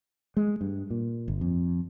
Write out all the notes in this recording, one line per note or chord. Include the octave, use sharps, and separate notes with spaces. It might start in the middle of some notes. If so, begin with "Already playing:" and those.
G#3
G2
A#2
G1
F2